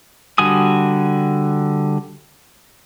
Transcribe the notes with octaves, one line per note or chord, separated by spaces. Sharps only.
D3 G3 F#4 G#5 D#6